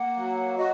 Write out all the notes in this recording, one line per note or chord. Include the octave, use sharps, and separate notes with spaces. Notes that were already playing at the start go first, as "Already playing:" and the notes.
Already playing: A#3 F#5
F#3
F#4 D#5